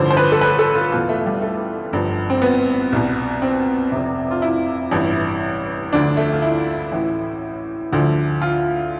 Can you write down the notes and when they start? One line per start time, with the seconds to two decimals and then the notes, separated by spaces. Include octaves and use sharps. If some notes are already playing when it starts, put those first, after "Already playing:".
Already playing: A1 G2 D3 F3 C5
0.10 C5
0.17 B4
0.32 A4
0.41 B4
0.59 A4
0.75 F4
0.92 E2 B2 F4
1.09 A3
1.26 G3
1.42 A3
1.93 G1 G2 F3
2.30 C4
2.42 B3
2.92 C2 B2
3.42 C4
3.92 F1 F2 C3
4.31 F4
4.42 E4
4.91 A1 G2 E3
5.91 D2 D3 F3 D4
6.17 A3
6.33 F4
6.42 E4
6.92 A1 A2 E3
7.92 D2 D3 F3
8.42 F4